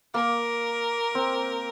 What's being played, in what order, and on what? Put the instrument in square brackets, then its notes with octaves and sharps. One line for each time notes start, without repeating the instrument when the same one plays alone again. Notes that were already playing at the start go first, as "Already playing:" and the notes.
[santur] A#3 [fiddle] A#4
[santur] C4